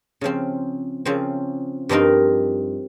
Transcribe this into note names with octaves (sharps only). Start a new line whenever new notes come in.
C#3 F3 C4
C#3 F3 C4
G2 F3 C4 D#4 A#4